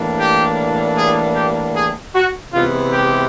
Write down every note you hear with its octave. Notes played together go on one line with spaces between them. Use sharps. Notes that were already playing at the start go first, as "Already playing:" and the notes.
Already playing: A2 E3 G3 A#3 D4
G4
G#4
G4
G#4
F#4
C3 E3 G#3 B3 F4
G4